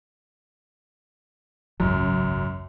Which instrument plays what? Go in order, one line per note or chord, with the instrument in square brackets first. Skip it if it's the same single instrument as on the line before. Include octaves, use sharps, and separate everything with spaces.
[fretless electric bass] G#1 C#2 [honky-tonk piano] F#2